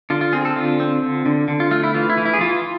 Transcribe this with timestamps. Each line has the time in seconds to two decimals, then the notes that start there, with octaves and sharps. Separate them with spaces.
0.10 D3 F4
0.21 F4
0.33 C4 G#4
0.45 A4
0.56 D3 F4
0.80 C4
1.02 D3
1.26 D3
1.48 D3
1.60 F4
1.71 A3 F4
1.83 E4
1.94 E3 F4
2.10 E4
2.17 E3
2.25 E4
2.34 G#4
2.40 E3 F4